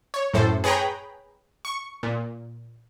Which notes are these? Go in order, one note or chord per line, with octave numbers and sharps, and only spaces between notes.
C#5
F#2 A2 A4 C5
G#4 B4 C#5 G5 A#5 B5
C#6
A#2